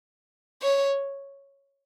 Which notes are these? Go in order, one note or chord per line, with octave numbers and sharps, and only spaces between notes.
C#5